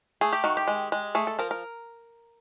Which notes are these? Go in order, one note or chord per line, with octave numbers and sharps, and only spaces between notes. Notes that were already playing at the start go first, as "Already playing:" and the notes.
A3 G#4
G4
D#3 F#4
G4
G#3
G#3
A3 G#4
A4
F3 A#4
A#4